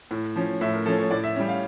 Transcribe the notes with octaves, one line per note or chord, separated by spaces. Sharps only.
A2
F3 C#4
A2 E5
A#4
F3 C#4 A4
C#5
A2 D5
E5
G3 C#4 E5
F5